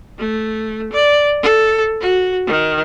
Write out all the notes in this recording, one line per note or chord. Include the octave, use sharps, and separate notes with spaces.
A3
D5
A4
F#4
D#3